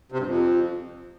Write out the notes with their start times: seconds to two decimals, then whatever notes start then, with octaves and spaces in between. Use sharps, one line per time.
0.12 C3
0.19 G2
0.26 F2